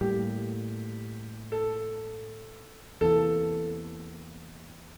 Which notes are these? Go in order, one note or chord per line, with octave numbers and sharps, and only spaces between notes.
A2 G3 A#3 G4
A4
E2 C3 E3 A#3 A4